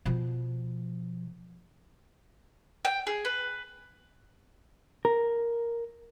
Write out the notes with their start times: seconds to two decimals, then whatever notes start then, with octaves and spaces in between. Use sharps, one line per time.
0.05 B2 F3
2.85 G5
3.07 G#4
3.25 B4
5.05 A#4